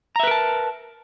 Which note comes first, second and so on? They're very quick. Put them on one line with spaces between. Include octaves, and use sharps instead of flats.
A#5 E5 B4 A#4 A5